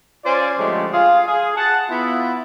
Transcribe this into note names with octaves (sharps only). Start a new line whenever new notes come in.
C#4 F4 C5 D5
D3 F3 G#3 A3 C#4 G4
F4 G#4 F5
G#4
F#5 A5
B3 E4 F4